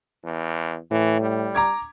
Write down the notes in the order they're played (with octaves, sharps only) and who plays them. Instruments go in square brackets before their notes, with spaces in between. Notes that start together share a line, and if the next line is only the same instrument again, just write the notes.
[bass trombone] E2
[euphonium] A2 [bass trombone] E3
[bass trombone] G3
[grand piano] A#5 D6 G#6